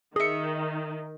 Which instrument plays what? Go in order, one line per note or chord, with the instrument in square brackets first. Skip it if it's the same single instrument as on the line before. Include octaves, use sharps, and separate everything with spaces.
[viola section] D#3 [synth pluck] G#4 C#7 [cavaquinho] D#5 E5